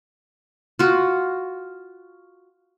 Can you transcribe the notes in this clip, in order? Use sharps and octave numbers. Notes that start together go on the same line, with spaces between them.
F4 F#4